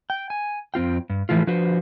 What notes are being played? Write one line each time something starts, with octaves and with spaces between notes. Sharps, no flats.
G5
G#5
F2 C4 F4 G5
G2
A2 E3 F3 A3 F4
F3 D4 F#4 B4 C5